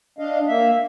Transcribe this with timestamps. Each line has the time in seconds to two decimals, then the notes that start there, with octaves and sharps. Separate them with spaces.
0.19 D4 D#5 F5
0.48 A#3 E5